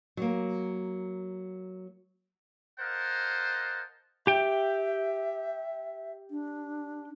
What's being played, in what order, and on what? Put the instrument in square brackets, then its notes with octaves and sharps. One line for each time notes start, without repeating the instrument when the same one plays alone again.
[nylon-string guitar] F#3 A#3
[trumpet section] A#4 C5 D#5 F5 F#5 A5
[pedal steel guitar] G4 G5 [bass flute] E5
[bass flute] D4